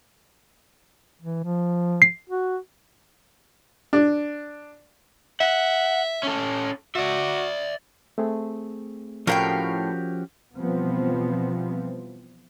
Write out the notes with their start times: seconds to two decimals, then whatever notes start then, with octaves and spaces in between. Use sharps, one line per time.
1.22 E3
1.44 F3
2.02 C7
2.30 F#4
3.93 D4
5.41 E5 F#5
6.23 C#4 A4
6.95 F#4 D5 E5
8.18 A3 C4 G#4
9.27 A2 F3 C#4 F#4 G4 A#4 F5 G5
10.55 B2 E3 F3 G3 B3 C4